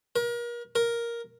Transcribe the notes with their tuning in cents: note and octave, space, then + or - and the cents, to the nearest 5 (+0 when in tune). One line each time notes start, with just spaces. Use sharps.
A#4 +35
A#4 +5